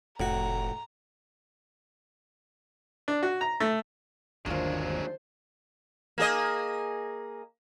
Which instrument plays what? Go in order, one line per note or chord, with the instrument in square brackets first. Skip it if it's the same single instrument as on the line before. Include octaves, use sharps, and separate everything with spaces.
[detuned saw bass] F1 [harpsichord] A2 F#4 [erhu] A#5
[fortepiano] D4
F#4
A#5
A3
[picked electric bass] G1 D#2 [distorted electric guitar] F#3 G#3 [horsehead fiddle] A#3 C5 [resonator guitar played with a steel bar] D4 F4
[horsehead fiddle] C5
[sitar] A#3 G#4 D#5